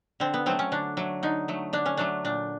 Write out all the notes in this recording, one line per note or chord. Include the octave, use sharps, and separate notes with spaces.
D3 C4
B3
F#3 A3 C4
C#4
D3 D4
F#3 A3
D3 D#4
F#3 A3
D3 D4
C#4
F#3 A3 D4
A#2 D4